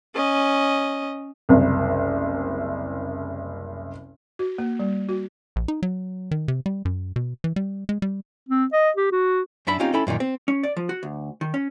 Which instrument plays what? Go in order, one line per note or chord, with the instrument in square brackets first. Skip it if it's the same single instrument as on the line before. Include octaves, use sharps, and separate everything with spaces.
[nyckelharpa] C#4 D#5
[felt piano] F#1 C2
[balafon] F#4
A#3
G3
F#4
[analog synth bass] A#1
D#4
F#3
D#3
C3
G3
F#2
B2
E3
G3
G#3
G3
[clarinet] C4
D#5
G4
F#4
[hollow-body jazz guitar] F#2 D4 E5 B5
C4 C#4 D#4 F4 G4
C#4 E4 A4 G5 B5
F#2 A#2 D3 D#3
C4
C#4
D5
F3
F#4
D2
D#3
C#4